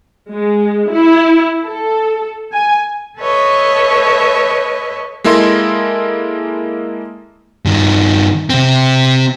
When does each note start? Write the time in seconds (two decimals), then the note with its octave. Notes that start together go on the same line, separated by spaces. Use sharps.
0.31 G#3
0.91 E4
1.64 A4
2.53 G#5
3.18 A4 B4 C#5 D#5 E5
5.24 G#3 A#3 E4 A4 D#5 C6
7.65 G2 D#3
8.50 C3 C4